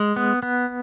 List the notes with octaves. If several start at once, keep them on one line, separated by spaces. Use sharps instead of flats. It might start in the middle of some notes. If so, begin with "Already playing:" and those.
Already playing: G#3
B3
B3